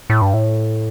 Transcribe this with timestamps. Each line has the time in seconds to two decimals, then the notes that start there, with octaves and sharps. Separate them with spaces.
0.10 A2
0.22 G2
0.34 A2